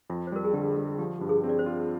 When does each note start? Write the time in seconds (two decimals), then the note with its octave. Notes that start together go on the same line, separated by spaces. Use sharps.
0.10 F2 F4
0.27 C5
0.32 G3 A#4
0.45 G#4
0.53 D3 G4
0.77 G3
0.99 F3 G4
1.21 G2
1.29 G#4
1.44 C4
1.49 D5
1.59 C5
1.66 F4